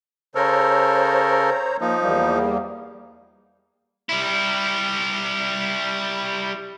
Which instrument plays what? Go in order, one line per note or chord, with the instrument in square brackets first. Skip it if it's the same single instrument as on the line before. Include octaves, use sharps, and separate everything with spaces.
[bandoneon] C#3 A4 A#4 [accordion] C5 C#5 A#5
[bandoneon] F3 D#4 [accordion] A#3
[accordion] E2 G3 A#3
[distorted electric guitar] G3 E4